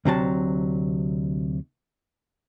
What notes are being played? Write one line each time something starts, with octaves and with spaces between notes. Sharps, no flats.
D2 C3 F#3 A5